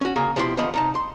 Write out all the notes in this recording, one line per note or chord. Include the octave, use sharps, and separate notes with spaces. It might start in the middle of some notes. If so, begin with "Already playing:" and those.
C#4 F#4
C#3 A#3 G#4
B2 F3 E4 G4 F#5 C6
E2 D3 F3 D#5 B5
C2 D#4 A5
C6